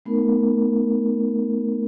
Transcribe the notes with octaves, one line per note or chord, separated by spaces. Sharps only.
A3 B3 D#4 A#4